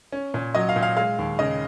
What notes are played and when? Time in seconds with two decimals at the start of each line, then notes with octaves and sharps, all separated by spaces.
0.12 C#4
0.34 A#2
0.55 F#3 D#5
0.69 F5
0.76 A#2
0.83 F5
0.96 G#3 F5
1.19 D#2
1.39 C#3 D#5